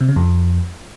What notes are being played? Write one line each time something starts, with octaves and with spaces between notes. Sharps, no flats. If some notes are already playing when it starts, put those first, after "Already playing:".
C3
C#3
F2